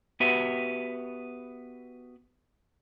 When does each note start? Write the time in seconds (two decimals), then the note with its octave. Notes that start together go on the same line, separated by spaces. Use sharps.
0.20 B3 F#4 G4 B4 E5